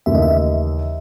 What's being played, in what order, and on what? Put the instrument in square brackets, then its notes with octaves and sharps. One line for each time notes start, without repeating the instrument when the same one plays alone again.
[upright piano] D#2 C#3 E3 A3 [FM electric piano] E5
[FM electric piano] D#5
E5